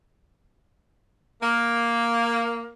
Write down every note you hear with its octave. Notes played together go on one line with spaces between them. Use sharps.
A#3